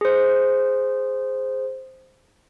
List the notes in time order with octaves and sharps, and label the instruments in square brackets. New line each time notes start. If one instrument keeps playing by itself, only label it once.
[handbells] G#4 C5